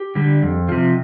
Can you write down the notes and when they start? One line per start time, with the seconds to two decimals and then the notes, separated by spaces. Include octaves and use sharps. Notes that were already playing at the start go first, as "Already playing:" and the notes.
Already playing: G4
0.15 D3 G3
0.42 F2
0.69 C3 F3